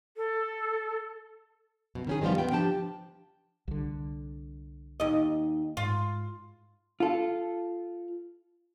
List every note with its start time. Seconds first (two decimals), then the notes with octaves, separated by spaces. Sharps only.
0.17 A4
1.95 F#2 B2
2.07 D#3 C#4 G#4
2.21 D#3 F3 G3 B3 F4
2.38 D2 B3 G5
2.51 F3 D4 G4 G5 A5
3.68 C2 D3
5.00 D#2 D#5
5.77 G#2 F4
7.00 F4 A4